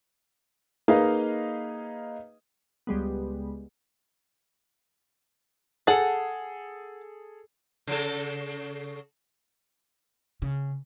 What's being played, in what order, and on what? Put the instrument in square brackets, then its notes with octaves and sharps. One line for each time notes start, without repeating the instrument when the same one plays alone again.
[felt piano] A#3 D#4 G#4 B4 D#5 F5
[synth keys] C#2 G3 G#3 B3
[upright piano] G#4 A4 [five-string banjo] F#5 A5
[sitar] C#3 A4
[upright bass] C#3